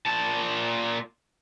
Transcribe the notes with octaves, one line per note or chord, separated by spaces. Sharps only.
A#2 A5